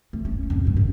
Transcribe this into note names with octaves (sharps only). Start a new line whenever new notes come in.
A3
C#4
F2 A2
E1 G2
F#2